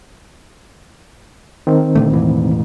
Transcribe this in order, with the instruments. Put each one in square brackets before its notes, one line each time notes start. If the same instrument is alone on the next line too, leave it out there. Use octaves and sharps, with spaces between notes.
[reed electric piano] D#3 C4
[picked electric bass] A#2 D3 A3
E1 A2 E3